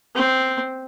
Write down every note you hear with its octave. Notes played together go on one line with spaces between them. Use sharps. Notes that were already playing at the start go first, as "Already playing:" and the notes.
C4